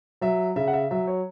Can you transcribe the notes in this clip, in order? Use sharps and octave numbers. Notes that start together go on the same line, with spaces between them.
F#3 E5
C#3 E5
F#5
E5
F#3 E5
C#5